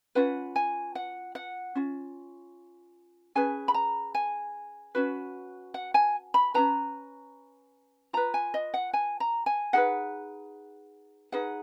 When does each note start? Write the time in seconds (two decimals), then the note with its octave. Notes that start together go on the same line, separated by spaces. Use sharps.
0.15 C#4 F4 B4 F#5
0.56 G#5
0.95 F#5
1.35 F#5
1.75 C#4 F4
3.35 C#4 G#4 B4 G#5
3.68 B5
3.74 A#5
4.15 G#5
4.95 C#4 F#4 B4
5.74 F#5
5.94 G#5
6.34 B5
6.54 C#4 G#4 B4 A#5
8.13 F4 B4 A#5
8.34 G#5
8.54 D#5
8.74 F#5
8.93 G#5
9.20 A#5
9.46 G#5
9.73 D#4 G#4 B4 F#5
11.32 D#4 G#4 B4 F#5